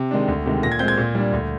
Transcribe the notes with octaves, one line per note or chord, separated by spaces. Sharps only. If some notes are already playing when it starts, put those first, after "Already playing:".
Already playing: C3
D#3 G#3 D4
D2
C3 D#3 G#3
A#2 A#6
G#6
G#3 C4 G6
G#6
A#2
G3 D4
D2